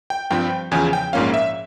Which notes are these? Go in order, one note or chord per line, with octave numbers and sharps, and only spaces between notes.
G5
G2 F3 C4 G5
E2 C#3 F3 G#5
G5
A#1 G#2 F3 A#3 C#4 F5
E5